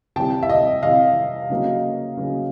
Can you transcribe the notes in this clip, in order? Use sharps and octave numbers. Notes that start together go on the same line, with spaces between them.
C3 E3 G3 G5 A5
E5
D#5
C3 E3 G3 D#5 F5
C#3 F#3 A#3
C#3 F#3 A#3